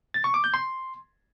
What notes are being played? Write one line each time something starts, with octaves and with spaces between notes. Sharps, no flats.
A6
C#6
D6
G6
C6